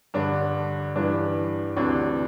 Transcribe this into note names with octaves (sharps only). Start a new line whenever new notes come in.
G2 D3 D4
G2 E3 D4
D2 C3 E3 D4